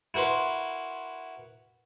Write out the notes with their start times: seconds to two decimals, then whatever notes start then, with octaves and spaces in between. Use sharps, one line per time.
0.14 E4 F#4 A#4 B4 C6